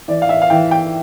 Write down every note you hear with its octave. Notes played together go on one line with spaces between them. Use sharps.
E3 D5
F5
E5
F5
E3 G5
G5